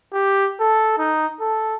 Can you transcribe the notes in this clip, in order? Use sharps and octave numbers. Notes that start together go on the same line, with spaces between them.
G4
A4
D#4
A4